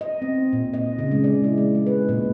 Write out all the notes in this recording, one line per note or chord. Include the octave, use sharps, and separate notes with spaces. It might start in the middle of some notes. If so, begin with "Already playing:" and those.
D#5
C4
A#2
D#5
C#3
G#3
D5
E4
G#3
G#3
B4
A#2